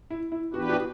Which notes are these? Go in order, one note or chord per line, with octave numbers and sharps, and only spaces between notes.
E4
E4
E3 B3 D4 F#4 G4 B4
F#4